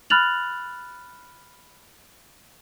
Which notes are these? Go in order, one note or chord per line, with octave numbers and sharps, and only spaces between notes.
B5 F6 F#6 A6 F7 F#7